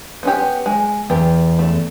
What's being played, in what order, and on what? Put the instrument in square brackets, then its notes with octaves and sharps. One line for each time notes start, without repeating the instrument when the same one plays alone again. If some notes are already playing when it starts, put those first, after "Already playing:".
[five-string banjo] B3 C#4 G4
G#3
[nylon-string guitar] E2 [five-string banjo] G4
[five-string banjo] A3